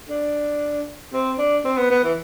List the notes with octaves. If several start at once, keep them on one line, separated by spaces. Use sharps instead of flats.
D4
C4
D4
C4
B3
B3
E3